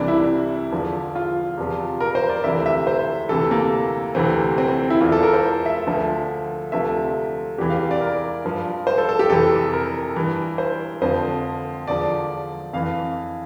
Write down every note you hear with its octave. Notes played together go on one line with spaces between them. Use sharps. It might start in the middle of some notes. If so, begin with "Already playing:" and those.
Already playing: C2 C3 E3 D4
E4
E2 D3 F3
F4
E2 C3 F3
A#4
C5
D5
D2 C3 E3 E5
E5
C5
D2 C3 E3 A4
A#3
D2 C3 E3 C4
C4
C4
E4
E2 E3 F4
A4
A#4
C5
E5
D2 D3 F3
D2 C3 F3 E5
E2 C3 E3 G4
F5
D5
A#4
G2 F3
C5
A4
A4
G4
F2 C3 E3 A4
A#4
G2 E3
C5
F2 D3 F3 C5
E2 D3 F3 D5
F2 E3 F5